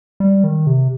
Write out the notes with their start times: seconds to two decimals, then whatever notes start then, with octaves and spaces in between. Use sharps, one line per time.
0.20 G3
0.44 D#3
0.67 C3